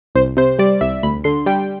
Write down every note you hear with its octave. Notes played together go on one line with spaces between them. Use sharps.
C2 C5
C3 C5
G3 D5
C2 E5
D2 B5
D3 C6
G3 G5